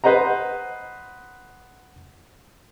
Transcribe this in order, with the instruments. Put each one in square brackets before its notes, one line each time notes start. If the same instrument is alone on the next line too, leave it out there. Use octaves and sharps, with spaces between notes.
[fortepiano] B4 C5 D#5 F#5 A#5